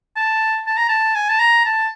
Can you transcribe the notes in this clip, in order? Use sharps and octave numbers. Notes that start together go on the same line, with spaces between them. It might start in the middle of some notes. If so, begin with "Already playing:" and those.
A5
A5
A#5
A5
G#5
A5
A#5
A5